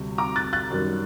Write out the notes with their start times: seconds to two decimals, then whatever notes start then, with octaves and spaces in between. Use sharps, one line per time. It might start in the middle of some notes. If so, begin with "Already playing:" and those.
Already playing: D2 C3 G3
0.18 A#5 D6
0.36 F#6 A6
0.53 F#6 A6
0.70 F#2 D#3 G3